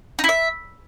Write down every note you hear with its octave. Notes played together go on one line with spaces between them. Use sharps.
D#4
E4
E5